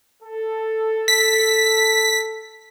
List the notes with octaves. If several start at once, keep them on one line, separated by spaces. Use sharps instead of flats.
A4
B6